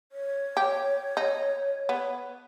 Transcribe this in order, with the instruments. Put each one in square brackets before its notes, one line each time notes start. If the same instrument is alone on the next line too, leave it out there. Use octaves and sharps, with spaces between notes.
[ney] C#5
[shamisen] G4
D#4
B3